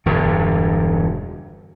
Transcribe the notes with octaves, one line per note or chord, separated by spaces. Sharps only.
E1 G2 D3